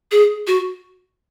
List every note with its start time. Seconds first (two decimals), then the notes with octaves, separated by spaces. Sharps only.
0.11 G#4
0.47 F#4